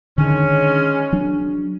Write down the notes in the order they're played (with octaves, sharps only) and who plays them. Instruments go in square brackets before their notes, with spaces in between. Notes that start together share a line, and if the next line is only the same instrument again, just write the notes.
[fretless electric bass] D3 D#3 [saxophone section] G#3 C#4
[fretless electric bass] F#3 D4